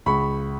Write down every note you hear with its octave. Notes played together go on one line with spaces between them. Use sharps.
C#2 B5 C#6